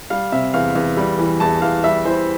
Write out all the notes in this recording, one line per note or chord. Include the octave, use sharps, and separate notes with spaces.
G3 F5
C3 E5
E2 F5
E2
G3
E3
E2 A5
E2 F5
G3 E5
E3 C5